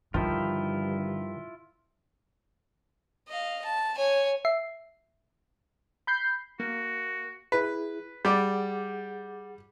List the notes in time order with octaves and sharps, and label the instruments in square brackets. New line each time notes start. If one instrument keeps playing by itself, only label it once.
[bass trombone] G2 [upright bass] D3 [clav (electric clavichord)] D#3 F3 [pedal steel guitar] E4 F4
[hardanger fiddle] D#5 F5
A5
C#5 G#5
[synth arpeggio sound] E5 C7
[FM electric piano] B5 G6 C7
[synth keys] A#3 [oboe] F#4
[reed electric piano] E4 G#4 [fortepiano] B4
[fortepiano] G3 D5 [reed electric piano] G#4 F#5 D6